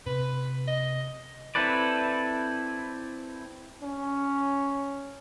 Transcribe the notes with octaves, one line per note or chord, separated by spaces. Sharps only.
C3 B4
D#5
C4 E4 A4 B4 D5
C#4